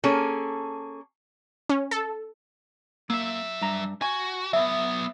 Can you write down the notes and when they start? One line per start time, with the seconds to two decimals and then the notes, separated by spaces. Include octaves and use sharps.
0.04 A#3 C#4 G#4 A4
1.69 C#4
1.91 A4
3.10 F#3 A#3 E5
3.62 G2 A#5
4.02 F#4 G#5
4.53 F#3 B3 E5